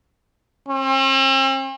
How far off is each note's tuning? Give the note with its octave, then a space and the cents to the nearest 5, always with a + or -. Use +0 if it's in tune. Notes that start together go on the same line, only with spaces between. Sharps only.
C4 +45